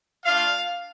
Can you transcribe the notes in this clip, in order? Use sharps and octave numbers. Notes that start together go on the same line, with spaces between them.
A3 D4 F4 F5